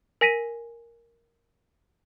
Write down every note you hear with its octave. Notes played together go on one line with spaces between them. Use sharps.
A#4 G#5 A#6 B6 D#7